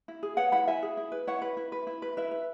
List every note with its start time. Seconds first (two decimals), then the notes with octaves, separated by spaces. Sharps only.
0.08 E4
0.23 G#4
0.37 B4 C#5 F#5
0.52 E4 F#5 B5
0.67 E4 E5 G#5
0.82 G#4
0.97 E4
1.12 B4
1.27 E4 C#5 F#5
1.42 B4
1.57 E4
1.72 B4
1.87 E4
2.02 B4
2.17 E4 B4 E5
2.31 B4